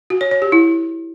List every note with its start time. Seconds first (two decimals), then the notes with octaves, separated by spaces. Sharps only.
0.10 F#4
0.21 C#5
0.31 C#5
0.42 G4
0.52 E4